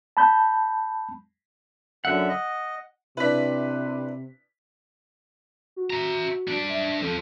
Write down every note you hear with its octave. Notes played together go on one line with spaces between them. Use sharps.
A5 B5 G6
F#2 D3 E5 F#5
D#5
C3 D4 E4 B4 B6
F#4
E5 A#5
G3 D4
E5
F3 C4 A4